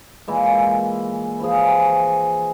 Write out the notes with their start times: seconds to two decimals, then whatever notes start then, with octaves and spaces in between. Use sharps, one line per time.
0.28 A#2 E3 G#3
1.40 E3 F3 G#4